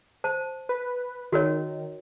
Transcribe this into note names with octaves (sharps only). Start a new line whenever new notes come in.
C5 A5
B4
D#3 F#4 A#4 C#5